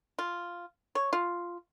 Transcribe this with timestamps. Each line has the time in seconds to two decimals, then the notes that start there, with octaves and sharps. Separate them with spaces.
0.19 F4
0.95 C#5
1.13 F4